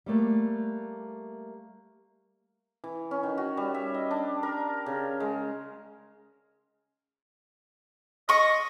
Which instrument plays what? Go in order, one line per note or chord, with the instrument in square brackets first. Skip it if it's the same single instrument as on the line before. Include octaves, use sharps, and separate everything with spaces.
[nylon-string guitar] G3 A3 A#3
[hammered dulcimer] E3
C#4
D#3
F#4
G3
E5
D#5
D4
A#4
C#3
G#3
[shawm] D#5 [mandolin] C#6 D#6